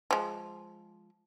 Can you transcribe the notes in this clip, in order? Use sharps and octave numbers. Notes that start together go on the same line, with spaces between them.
F3 G#3